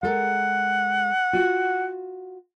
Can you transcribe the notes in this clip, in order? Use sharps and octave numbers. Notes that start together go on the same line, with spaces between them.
G#3 A4 A#4 F#5
F4 F#4